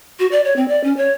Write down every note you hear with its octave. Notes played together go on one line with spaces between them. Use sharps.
F#4
D5
C#5
C4
D5
C#4
C#5